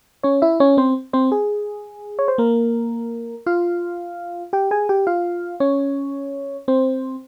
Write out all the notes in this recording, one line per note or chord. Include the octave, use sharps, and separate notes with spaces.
C#4 C#5
E4 E5
C#4 C#5
C4 C5
C4 C5
G#4
C#5
C5
A#3 A#4
F4 F5
G4 G5
G#4 G#5
G4 G5
F4 F5
C#4 C#5
C4 C5